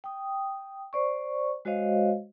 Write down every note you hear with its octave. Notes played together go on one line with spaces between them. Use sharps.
G5 D#6
C5 D5 C#6
G#3 F#4 C5 C#5 D#5 F5